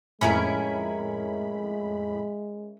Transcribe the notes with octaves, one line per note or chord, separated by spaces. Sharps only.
F2 A2 G#3 C#4 E4 A#4 B5